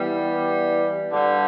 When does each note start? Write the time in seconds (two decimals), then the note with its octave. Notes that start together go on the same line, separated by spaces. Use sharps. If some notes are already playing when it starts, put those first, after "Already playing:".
Already playing: E3 G3 B3
1.13 G2 D3 G3